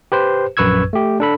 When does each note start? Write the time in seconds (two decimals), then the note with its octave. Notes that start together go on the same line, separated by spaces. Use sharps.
0.12 G4 B4 C5
0.57 A#1 F#2 B4 C#6 E6 G#6
0.93 A3 G4
1.20 D4 A4 B5